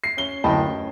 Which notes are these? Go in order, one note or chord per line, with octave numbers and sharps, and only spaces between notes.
C7
C#4 G7
D1 F#2 D#5 G5 A5 B5
C#4